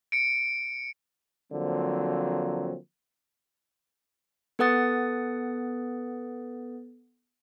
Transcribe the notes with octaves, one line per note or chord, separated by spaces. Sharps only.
C#7 D7
D3 F3 F#3 A#3 C4
B3 A4 B4 F#5 D#6 A6